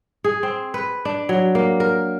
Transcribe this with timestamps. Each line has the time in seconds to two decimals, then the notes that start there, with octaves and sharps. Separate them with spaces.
0.24 G#4
0.43 C4
0.74 B4
1.05 D4
1.29 F#3
1.55 A#3
1.80 A#4